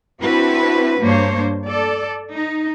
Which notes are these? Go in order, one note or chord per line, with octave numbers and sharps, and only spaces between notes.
C4 D4 E4 F#4 B4
G2 A#3 D4 C5 C#5
A4 D5
D#4